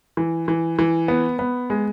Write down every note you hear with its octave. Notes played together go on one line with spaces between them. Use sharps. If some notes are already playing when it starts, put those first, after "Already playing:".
E3
E3
E3
B3
B3
G#3